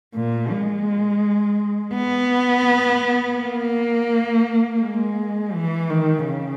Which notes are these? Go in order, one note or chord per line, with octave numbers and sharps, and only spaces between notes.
A#2
G#3
B3
A#3
G#3
E3
D#3
C#3